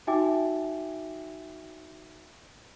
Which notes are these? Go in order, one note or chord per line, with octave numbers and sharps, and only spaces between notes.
D#4 F#4 E5 G5 G#5 D6